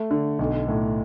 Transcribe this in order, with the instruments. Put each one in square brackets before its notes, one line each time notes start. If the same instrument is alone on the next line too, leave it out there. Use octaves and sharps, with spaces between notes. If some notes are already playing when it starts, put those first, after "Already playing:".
Already playing: [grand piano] A3
D3
B1
A2